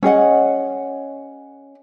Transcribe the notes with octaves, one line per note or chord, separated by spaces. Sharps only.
C#4 G#4 D#5 F#5